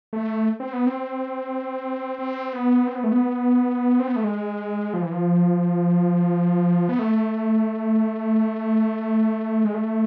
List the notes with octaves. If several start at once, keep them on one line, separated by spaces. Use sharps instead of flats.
A3
C4
B3
C4
C4
B3
C4
B3
A3
B3
C4
B3
A3
G#3
F3
E3
F3
B3
A3
G#3
A3